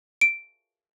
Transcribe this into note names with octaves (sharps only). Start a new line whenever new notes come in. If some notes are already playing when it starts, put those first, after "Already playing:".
D7